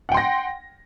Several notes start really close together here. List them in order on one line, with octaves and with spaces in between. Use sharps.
F#5 G5 C6 A#6